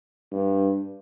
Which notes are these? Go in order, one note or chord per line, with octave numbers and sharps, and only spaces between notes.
G2